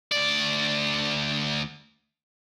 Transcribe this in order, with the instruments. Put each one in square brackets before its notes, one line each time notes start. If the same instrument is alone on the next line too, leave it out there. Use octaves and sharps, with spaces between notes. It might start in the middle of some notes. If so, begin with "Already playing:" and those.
[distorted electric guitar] D2 D5